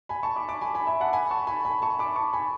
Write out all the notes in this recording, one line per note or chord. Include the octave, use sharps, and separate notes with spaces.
G#5 B5
A5 C#6
B5 D6
B5 D6
G#5 B5
G#5 B5
E5 G#5
F#5 A5
G#5 B5
A5 C#6
G#5 B5
G#5 B5
A5 C#6
B5 D6
A5 C#6
G#5 B5